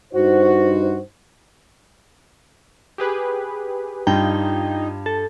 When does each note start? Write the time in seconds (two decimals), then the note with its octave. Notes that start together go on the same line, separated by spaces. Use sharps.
0.14 G2 D#4 F#4 C5
2.98 G4 G#4 B4
4.07 G2 D#4 F4 G5
5.06 A4